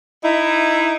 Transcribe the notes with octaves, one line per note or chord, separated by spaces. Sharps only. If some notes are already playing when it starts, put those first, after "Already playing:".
D#4 E4